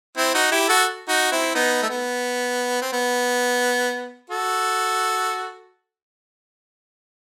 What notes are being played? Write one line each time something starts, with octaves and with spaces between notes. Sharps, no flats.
C4 E4
D#4 F#4
E4 G4
F#4 A4
D#4 F#4
C4 E4
B3 D#4
A3
B3
C4
B3
F#4 A4